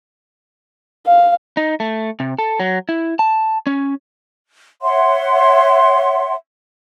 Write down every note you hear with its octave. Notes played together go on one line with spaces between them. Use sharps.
F5
D#4
A3
C3
A4
F#3
E4
A5
C#4
C#5 E5 F#5 C6